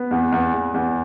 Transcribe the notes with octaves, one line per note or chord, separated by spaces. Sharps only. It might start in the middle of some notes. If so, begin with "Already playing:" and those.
Already playing: B3
E2
E2
E2
E2